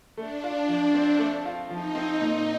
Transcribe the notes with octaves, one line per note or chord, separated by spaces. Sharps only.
A3 D4
F4
F3
C4
A3
F4
F3 D#4
C4
A#2 D#4